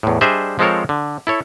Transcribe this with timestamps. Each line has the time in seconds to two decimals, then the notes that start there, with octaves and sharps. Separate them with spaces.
0.03 E2 A2
0.21 G3 D4 G#4 C5 D#5 E5
0.59 F3 G#3 C4 A4 A#4 C#5
0.89 D3
1.27 E4 A4 C#5